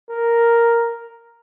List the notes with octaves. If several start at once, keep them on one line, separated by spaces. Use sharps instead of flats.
A#4